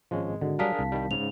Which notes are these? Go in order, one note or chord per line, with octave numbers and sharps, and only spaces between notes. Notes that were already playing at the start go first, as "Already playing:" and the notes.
G#1 F3 G#3 C#4
D3 F#4
F#3 G3 D4 G#4 A#4 F5 A5 B6
C2
D#3 G3
G#2 C#3 F7